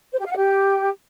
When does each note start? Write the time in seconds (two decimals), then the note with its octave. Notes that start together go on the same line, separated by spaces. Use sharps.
0.12 C5
0.18 G4
0.24 F5
0.31 F#5
0.37 G4